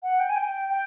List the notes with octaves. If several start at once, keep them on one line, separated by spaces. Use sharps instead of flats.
F#5
G5
G#5
G5
G5